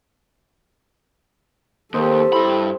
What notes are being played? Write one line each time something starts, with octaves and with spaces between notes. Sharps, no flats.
D#2 A#3 C4 G4 A4 C5 D#5
G2 E4 B5 C6 E6